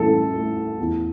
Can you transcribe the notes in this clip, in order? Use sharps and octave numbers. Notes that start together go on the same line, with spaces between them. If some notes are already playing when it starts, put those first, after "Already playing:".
Already playing: A1 G2 E3 A4
A3
E2